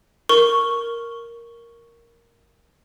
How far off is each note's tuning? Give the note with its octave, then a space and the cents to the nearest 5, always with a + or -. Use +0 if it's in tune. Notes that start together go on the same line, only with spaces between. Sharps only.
A#4 +0 C#6 +0